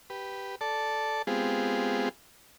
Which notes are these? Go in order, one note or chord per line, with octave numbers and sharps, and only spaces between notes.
G4 B4
A4 D5 A5
G#3 B3 C4 F4 G4 G#4